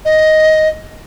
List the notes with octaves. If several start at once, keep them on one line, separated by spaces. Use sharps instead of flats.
D#5